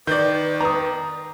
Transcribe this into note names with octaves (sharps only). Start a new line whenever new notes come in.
D#3 B4 D5 G6
A#5 D#6